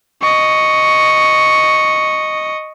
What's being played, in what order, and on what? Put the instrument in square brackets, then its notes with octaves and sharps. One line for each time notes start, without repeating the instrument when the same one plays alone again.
[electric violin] D#5 C#6